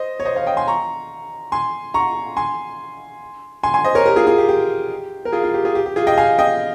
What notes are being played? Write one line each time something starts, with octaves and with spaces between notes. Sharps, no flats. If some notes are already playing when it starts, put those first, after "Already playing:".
Already playing: C5 D#5
C#5
C5 D#5
C#5 F5
D#5 G5
G#5 C6
A#5 C#6
G#5 C6
A#5 C#6
G#5 C6
G#5 C6
G#5 C6
C5 D#5
A#4 C#5
G4 A#4
F4 G#4
F4 G#4
G4
G4
A#4
F4 G#4
F4
G4
F4 G#4
G4
G4
F4 G#4
D#5 G5
F5 G#5
D#5 G5